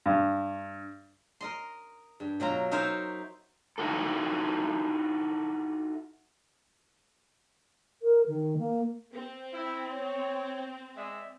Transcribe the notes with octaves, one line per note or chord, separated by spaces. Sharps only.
G2
A#4 D#5 C6
G2
B2 F#3 F4 A#5
D#4 A#4 C5 C#5 E5
D#4 E4 F#4 A4
A#4
D#3
A#3
C4
E4
C#5
G#3 D5 E5